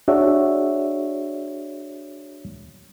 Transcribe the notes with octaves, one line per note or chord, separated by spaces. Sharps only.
D4 F#4 G#4 C#5 D5 E5